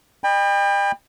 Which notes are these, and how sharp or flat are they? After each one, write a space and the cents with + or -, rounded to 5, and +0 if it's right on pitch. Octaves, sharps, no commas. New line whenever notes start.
D#5 -45 G5 +35 B5 -5